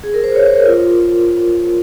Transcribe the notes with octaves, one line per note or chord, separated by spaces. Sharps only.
G#4
A#4
C5
C#5
C5
A#4
F4